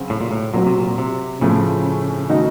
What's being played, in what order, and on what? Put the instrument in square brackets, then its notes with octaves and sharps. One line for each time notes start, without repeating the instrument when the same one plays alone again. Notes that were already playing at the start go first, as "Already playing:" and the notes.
Already playing: [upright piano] C#3 F#3 C4 F#4
[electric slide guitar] A2
A#2
A2
[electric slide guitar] A#2 [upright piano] F#3 C4 F#4
[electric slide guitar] C3
A#2
C3
[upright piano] A2 F3 A3 C#4 [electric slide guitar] C#3
[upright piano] D#3 A3 D#4 F#4